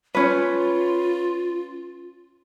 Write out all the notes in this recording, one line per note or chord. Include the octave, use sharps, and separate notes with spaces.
C#4 F4 B4